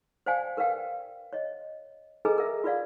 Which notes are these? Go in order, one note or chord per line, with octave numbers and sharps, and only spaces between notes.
C5 D5 F5 G5 G#5
A#4 B4 D5 F5 G5
C#5 D#5
G#4 A4 B4 D#5 G#5 A#5
A#4 E5
F4 B4 D5 F5